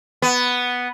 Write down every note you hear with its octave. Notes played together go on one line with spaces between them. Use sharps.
B3